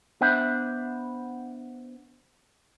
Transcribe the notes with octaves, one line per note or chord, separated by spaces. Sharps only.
B3 D4 C5 E5 F#5